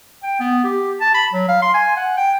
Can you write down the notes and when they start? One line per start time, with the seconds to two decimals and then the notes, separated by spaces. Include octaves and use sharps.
0.23 G5
0.40 B3
0.64 G4
1.01 A5
1.14 B5
1.33 F#3
1.49 F5
1.62 C6
1.74 G#5
1.96 F#5
2.17 G5